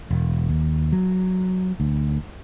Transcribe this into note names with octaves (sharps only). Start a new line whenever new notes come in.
E1
D#2
F#3
D2